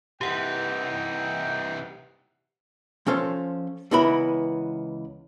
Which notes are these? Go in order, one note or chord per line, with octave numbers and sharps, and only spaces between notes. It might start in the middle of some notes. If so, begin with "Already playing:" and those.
C2 E3 D#4 G4 F#5 G5
F3 C#4 A4 C5
C#2 E3 B3 E4 A#4 B5